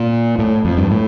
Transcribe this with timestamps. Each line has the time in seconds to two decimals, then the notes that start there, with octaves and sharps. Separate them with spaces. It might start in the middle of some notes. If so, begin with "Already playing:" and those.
Already playing: A#2
0.39 A2
0.65 F2
0.78 G2
0.91 A2